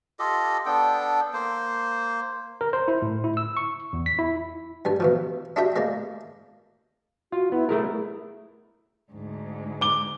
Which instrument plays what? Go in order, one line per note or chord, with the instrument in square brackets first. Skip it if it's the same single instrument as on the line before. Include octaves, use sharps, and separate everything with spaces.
[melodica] F4 G4 A4 D#5
B3 D4 A4 G5
A#3 C5
[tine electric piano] A#4
C5
E4
A2
E4
E6
C#6
E2
B6
E4
[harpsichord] G2 G3 G#5
B2 E3 F3
D4 E4 F#4 G4 E5 G5
G#3 A#3 D5
[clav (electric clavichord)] F4 [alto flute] F#4
[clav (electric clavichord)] B3 [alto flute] E4
[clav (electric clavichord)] A3 E4 A#4 [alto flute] G#4
[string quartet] D2 G#2
[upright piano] D6 G7